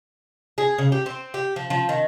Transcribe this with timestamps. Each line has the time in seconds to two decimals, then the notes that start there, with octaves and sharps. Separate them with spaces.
0.58 G#4
0.78 C#3
0.92 G4
1.06 C4
1.34 G4
1.56 F3
1.70 F3
1.89 D#3